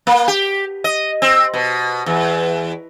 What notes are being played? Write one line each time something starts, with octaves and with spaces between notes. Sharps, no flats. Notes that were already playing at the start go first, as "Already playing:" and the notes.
A#3
G4
D#5
C4
B2
E2